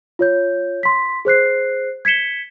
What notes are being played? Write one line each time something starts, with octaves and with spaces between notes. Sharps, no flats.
F4 C#5 G6
C6 B6
G#4 C5 F#6 C7
G#6 B6 C#7 E7 G7